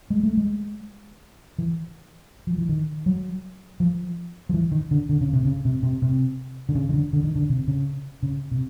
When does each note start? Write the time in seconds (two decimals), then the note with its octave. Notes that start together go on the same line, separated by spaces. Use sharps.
0.10 G#3
0.23 A3
0.37 G#3
1.58 E3
2.47 F3
2.58 E3
2.69 D#3
3.06 F#3
3.80 F3
4.49 F3
4.54 E3
4.72 D#3
4.91 D3
5.09 D3
5.21 C#3
5.33 C3
5.45 C#3
5.65 C3
5.83 C3
6.02 C3
6.69 D3
6.75 C#3
6.89 D#3
6.94 D3
7.13 D3
7.24 D#3
7.35 D3
7.50 C3
7.68 C#3
8.23 C#3
8.51 C3